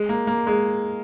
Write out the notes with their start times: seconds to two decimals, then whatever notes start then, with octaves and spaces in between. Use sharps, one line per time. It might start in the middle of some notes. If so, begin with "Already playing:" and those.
Already playing: G#3
0.09 A#3
0.27 A#3
0.47 G#3